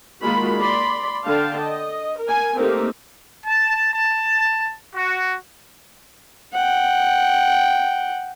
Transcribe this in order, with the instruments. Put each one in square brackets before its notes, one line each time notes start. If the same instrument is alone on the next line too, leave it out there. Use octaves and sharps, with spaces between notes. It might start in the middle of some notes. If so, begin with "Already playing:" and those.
[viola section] D#3 G#3 A#3 F4 F#4 B5
D5 B5 C6
D3 F5 G5 A5
D#5
A#4 G#5
A3 A#3 C4 D#4 G4 A#4
[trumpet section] A5
A5
F#4
[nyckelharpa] F#5 G5